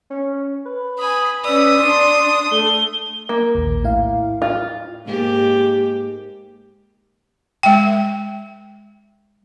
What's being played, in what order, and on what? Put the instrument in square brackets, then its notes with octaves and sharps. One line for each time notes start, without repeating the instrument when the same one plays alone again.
[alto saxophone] C#4
B4
[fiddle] G#5 B5 [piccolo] D#6
[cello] C#4 B4 [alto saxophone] D5 [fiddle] D#6 [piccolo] E6
[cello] D4 [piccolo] C6
[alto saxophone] A3 [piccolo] G7
[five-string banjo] A#3
[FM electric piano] A#1 D#2
A2 E4 F5
[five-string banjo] F4
[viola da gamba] G#2 A#3 G4
[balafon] G#3 G5